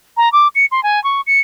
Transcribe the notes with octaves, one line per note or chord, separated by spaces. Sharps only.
A#5
D6
C#7
C6
G#5
C#6
C#7